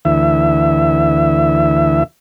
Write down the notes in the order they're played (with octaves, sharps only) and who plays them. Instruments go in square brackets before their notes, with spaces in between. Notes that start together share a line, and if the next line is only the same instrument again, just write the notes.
[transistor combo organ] D2 E3 E5